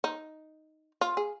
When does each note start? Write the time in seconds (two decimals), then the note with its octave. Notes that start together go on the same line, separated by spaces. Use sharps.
0.04 D#4
1.01 F4
1.17 G#4